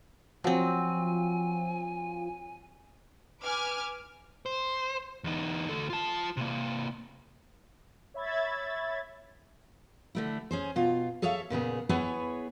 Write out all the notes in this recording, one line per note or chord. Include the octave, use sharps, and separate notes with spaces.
F3 F#3 C4 G#5
B4 G#5 D6 F6
C5
E2 D#4
D2 A4
F4 A5
C3 A#3
C#5 E5 B5 G#6 A6
D3 A3 E4
C#4 G#4 C5
B2 F4
G#4 A4 C#5 E5 F5
A#2 C#3 B3 G#4
B3 E4 G#4 B4 C#5